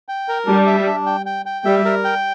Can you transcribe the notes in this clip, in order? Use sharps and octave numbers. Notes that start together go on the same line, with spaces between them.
G5
A#4
G3 D4
E5
D4
G5
G5
G5
G3 E5
A#4
G5